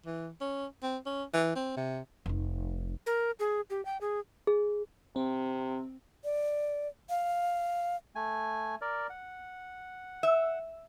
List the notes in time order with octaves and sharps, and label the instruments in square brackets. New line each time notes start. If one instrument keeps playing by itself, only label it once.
[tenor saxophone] E3
C#4
C4
C#4
E3
C4
C3
[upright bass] F1 D#4
[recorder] A#4
G#4
G4
G5
G#4
[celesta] G#4
[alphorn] C3 [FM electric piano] C4
[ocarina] D5
F5
[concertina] A3 G#5
A#4 D5
F#5
[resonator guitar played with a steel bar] E5